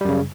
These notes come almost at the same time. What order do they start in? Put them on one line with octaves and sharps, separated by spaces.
G3 F#2 C#3